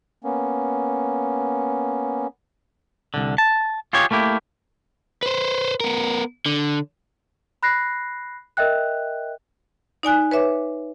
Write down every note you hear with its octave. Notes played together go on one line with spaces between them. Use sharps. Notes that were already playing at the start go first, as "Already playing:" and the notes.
A#3 B3 C#4
C2 D3
A5
F4 G4 G#4 C#5
A3 A#3 E4 G4
B4 C5
B3 A#4
D3
B5 F#6 A#6 C7
A#4 D#5 E5 G5 F#6
D#4 D5 G#5 F#6
B4 C#5 E5 D6